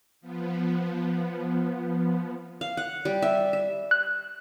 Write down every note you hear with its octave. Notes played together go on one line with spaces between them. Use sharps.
F3 B3
F5
F#5
G3
E5
E5
F#6